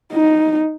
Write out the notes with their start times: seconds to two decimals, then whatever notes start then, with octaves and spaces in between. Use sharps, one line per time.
0.13 D#4